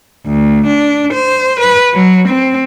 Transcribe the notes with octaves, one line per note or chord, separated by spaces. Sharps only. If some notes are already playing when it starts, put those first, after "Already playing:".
D2
D4
C5
B4
F#3
C4